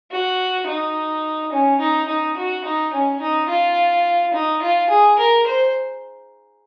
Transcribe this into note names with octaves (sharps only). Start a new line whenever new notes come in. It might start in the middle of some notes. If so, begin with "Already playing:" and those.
F#4
D#4
C#4
D#4
D#4
F#4
D#4
C#4
D#4
F4
D#4
F4
G#4
A#4
C5